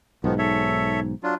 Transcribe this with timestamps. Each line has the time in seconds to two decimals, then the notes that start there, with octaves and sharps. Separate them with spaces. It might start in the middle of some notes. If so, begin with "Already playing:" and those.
0.24 B1 G#2 D#3 F3 B3
0.39 A4 C#5 E5
1.23 F#3 D4 F4